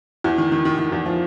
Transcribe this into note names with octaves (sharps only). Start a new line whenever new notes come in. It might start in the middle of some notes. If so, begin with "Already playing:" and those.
E2 E3
D#3
D#3
D#3
D#3
E2 E3
F3